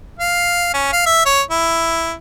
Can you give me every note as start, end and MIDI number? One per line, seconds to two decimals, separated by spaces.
0.19 0.71 77
0.74 0.89 61
0.92 1.03 77
1.06 1.23 76
1.26 1.41 73
1.51 2.14 64